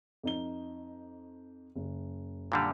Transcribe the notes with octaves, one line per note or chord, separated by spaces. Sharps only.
F2 D#4 G7
F#1
A#2 D3 G3